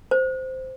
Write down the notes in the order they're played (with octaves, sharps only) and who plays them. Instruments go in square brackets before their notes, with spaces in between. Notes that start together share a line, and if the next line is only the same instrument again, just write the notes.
[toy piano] C5